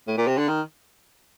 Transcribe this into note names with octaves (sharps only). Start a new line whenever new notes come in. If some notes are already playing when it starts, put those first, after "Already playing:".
A2
A#2
C3
D3
D#3